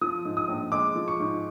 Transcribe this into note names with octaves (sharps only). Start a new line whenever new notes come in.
F3 D#6
G#2
D#6
A#1
G#3 D6
F3
C#6
G#2